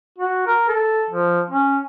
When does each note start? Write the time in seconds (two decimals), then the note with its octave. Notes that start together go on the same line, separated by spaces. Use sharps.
0.18 F#4
0.47 A#4
0.69 A4
1.10 F3
1.51 C#4